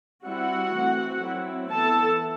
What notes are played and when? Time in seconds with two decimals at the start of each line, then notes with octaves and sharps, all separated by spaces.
0.25 G3 C4 E4 F#4 F#5
0.73 E3 A3 C4
1.23 F#3 C4 E4
1.71 E3 B3 E4 A4 A5